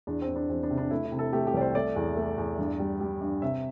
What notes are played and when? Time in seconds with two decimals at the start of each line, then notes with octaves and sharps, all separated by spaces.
0.07 E2 D4
0.22 C4
0.29 E2
0.36 D4
0.49 E2 C4
0.63 D4
0.70 C3
0.77 D4
0.91 A3 E4
1.05 E4
1.12 C3
1.19 A4
1.33 A3 G4
1.47 G4
1.54 C2 D5
1.61 C5
1.75 A3 D5
1.96 E2
2.17 A3
2.38 E2
2.59 G2
2.79 G3
3.01 G3
3.21 G2
3.42 C3 E5